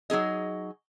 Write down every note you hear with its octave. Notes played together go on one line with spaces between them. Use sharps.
F#3 D#4 G#4 D#5